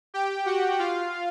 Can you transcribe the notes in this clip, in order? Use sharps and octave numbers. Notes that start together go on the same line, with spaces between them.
G4 G5
F#4 F#5
F4 F5